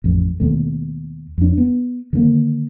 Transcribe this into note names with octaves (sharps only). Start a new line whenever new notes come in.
A1 F2
D#2 B2 A3
F2 D4
B3
D3 D#3 G#3 A#3